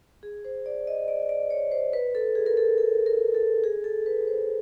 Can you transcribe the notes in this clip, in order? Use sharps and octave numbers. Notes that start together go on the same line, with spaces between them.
G#4
C5
D5
D#5
D5
D5
C#5
C5
B4
A4
G#4
A#4
A4
A4
A#4
A4
G#4
A4
B4
C5